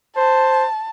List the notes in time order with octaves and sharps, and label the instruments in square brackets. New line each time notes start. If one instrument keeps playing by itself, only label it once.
[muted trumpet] C5 [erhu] A5